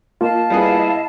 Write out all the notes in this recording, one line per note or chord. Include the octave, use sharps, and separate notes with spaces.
A#3 F4 D#5 F5 A5
G3 B3 E4 G#4